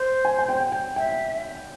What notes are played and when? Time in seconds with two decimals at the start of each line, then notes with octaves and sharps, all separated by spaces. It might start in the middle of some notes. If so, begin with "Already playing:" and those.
Already playing: C5
0.25 G#5
0.39 G#5
0.49 G5
0.60 G5
0.72 G5
0.96 E5 G5